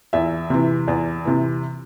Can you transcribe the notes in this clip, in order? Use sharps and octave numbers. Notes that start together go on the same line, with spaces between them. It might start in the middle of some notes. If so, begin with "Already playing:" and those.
E2 E5
C3 E3
E2
C3 E3